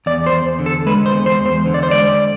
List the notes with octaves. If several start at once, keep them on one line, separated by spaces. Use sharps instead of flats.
E2 D5
C5
E2
D3
A4
G#3 B4
C5
E2
C5
E2
C5
D3
D5
C5
G#3 D5